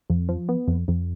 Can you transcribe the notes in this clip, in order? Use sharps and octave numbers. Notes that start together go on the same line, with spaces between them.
F2
F3
B3
F2
F2